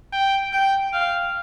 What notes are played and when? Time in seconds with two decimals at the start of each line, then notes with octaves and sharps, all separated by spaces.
0.13 G5
0.53 G5
0.93 F5